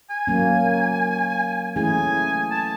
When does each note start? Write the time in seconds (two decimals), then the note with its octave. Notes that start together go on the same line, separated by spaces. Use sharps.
0.10 G#5
0.27 F#3 A#3 C#4
1.76 E3 A3 C#4 E4 G#4 G#5
2.51 A5